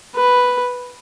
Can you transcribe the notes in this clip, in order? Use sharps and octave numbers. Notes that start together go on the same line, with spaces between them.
B4